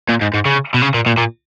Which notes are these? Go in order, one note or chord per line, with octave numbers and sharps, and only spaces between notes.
A#2
G#2
G#2
C#3
B2
C#3
A#2
A#2
A#2